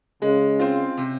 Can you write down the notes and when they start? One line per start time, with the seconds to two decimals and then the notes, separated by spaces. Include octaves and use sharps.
0.22 C#3 G#3
0.59 C4 F4
0.98 C3